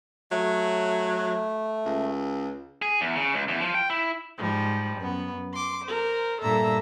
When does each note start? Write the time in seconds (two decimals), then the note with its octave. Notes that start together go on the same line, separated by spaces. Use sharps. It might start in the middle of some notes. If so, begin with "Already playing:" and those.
0.32 F#3 A3
1.85 C#2
2.82 G#4
3.01 E2
3.16 C#3
3.34 C#2
3.48 E2
3.61 F3
3.74 G5
3.90 E4
4.38 G#2 F3 G3
4.97 F#2 B3
5.53 C6 D6
5.85 A#4 C5
6.42 G2 A#2 A4 E5 A#5